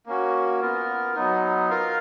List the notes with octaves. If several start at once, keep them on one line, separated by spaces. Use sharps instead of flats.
A#3 C#4 F#4
B3 F4 A#4
F#3 B3 D#4
F4 A#4 F5